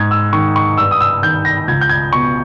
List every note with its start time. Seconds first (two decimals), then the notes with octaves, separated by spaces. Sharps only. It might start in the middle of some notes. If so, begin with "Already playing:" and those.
Already playing: G#2 G#6
0.11 E6
0.33 D#3 C#6
0.56 C#6
0.78 G2 E6
0.91 D#6
1.01 E6
1.22 D#3 G6
1.45 A#6
1.67 C#2 G#6
1.81 G6
1.89 G#6
2.13 B2 C#6